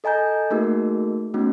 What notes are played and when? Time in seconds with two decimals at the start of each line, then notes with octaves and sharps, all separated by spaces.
0.04 A4 D#5 G#5 A#5 G6
0.51 A3 A#3 D#4 F#4 G#4 A#4
1.34 A3 B3 C#4 D#4 F#4